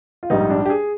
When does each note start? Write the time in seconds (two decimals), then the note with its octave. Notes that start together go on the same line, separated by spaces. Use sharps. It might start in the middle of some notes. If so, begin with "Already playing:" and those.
0.23 F4
0.30 A#1 G#2 G3 D#4
0.50 D4
0.66 G4
0.70 G#4